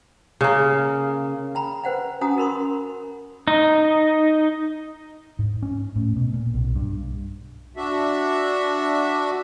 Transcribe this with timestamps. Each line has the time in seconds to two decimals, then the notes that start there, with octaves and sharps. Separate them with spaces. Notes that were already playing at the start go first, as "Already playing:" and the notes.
0.41 C#3 A#3
1.55 G5 A#5 B5
1.84 B4 C5 F#5 G5
2.21 C#4 F#4 F#5 G#5 A#5 D#6
2.38 A#4 B5 C6 D#6
3.48 D#4
5.39 G#2
5.62 C#4
5.96 A2
6.16 B2
6.33 A#2
6.54 B1
6.75 G2
7.77 D4 F#4 E5